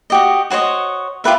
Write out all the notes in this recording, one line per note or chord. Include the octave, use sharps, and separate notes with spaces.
F#4 G4 D#5
F#4 C5 C#5 D#5
F4 G4 B4 E5